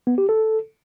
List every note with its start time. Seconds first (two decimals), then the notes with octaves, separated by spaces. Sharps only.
0.07 B3
0.18 G4
0.29 A4